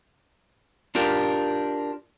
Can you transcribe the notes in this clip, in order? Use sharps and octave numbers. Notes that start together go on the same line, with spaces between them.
D4 F4 G4 A#4